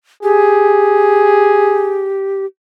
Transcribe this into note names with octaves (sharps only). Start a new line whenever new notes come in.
G4 G#4